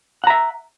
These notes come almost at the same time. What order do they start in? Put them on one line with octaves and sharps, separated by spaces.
F#5 A#5 E5